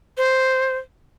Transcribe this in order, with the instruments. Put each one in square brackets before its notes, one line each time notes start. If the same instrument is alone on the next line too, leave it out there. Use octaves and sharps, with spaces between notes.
[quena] C5